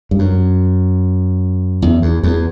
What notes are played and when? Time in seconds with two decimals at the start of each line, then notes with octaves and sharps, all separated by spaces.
0.11 G2
0.19 F#2
1.82 E2
2.02 E2
2.24 E2